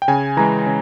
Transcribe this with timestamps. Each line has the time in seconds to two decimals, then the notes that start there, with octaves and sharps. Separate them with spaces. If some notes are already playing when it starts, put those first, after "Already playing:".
0.02 G5
0.08 C#3 G#5
0.37 E3 G#3 A#5
0.66 C#3